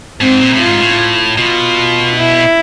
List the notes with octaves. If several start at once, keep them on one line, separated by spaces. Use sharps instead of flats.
G#2 C4
A#2
A2
F4
G#2
A2
B2 F4
E4